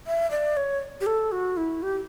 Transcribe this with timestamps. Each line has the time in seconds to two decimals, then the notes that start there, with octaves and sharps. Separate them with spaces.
0.07 E5
0.31 D5
0.57 C#5
1.01 G4
1.06 A4
1.32 F#4
1.57 E4
1.82 G4